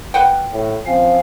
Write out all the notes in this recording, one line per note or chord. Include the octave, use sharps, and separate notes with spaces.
B4 F#5 G5
A2
F3 C4 C#4 F5